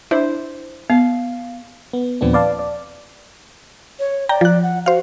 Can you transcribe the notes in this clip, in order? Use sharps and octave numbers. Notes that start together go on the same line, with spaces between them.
D4 E4 C5
B3 F5
B3
D#2 A#2 F3 B3 C4 D4
B4 D5 F5 A5
D5
C#5
D5 G5 A#5
F3 F#6
F#5
F#4 C5 F5